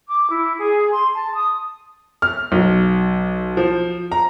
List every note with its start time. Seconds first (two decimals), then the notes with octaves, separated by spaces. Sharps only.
0.08 D6
0.31 E4
0.61 G#4
0.91 C6
1.14 A5
1.34 D#6
2.22 F6
2.52 B1
3.57 F3
4.12 A#5